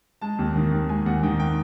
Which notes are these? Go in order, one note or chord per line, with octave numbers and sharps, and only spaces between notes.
G#3 A5
D#2
D#3
D#2
G#3 G#5
D#2 F#5
D#3 G5
G5